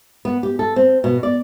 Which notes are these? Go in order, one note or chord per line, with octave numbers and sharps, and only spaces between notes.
B3
G4
A4
C4
B2
D5